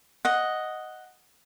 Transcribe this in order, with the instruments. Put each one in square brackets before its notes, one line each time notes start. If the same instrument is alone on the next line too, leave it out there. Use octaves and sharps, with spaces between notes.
[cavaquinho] D#5 F#5